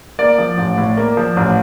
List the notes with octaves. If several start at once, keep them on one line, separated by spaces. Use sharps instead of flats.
A#3 D5
F3
A1
A2
A#3
F3
A1